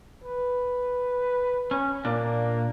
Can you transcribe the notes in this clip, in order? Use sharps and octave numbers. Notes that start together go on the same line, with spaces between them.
B4
C#4
A#2 A#3 D4